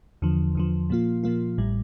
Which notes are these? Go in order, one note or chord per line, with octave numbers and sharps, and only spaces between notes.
E2 D3 F3
E2 D3 F3
A#2 F3 A#3 F4
A#2 F3 A#3 F4
A1 A2 G3